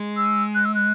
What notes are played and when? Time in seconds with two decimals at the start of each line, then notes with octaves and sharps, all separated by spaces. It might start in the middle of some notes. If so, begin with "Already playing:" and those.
Already playing: G#3
0.17 E6
0.55 F#6
0.65 E6
0.75 F#6